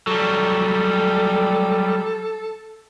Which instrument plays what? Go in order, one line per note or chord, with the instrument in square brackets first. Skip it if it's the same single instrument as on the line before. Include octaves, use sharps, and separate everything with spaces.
[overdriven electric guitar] F#3 G3 [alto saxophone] A4